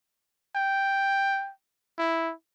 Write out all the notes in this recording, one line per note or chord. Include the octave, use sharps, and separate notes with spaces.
G5
E4